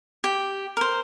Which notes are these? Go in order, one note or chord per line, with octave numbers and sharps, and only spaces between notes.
G4
A#4 C5